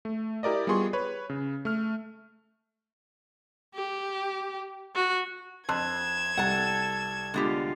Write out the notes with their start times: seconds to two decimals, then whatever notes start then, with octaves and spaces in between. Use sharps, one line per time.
0.05 A3
0.43 E4 G4 A#4 D5 D#5
0.67 G3 B3 F4 G#4 C6 C#6
0.93 B4 C#5 B5
1.30 C#3
1.65 A3 F6
3.74 G4
4.95 F#4
5.69 F2 A5 C6 F#6 G#6 E7
6.37 C2 A4 F#5 A5
7.34 D3 G#3 B3 F4 G4